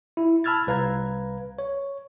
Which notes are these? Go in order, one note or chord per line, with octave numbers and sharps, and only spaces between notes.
E4
A5 B5 E6 F6 G#6 A6
C2 B4 F5 A#5 G#6
C#5